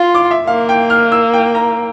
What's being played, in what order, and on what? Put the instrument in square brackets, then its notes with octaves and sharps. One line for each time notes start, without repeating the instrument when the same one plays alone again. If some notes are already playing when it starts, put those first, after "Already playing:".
Already playing: [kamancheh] F4 [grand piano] C6
[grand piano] D6
E5
[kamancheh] A#3 [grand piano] F5
[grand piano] G5
F6
E6
G5
A#5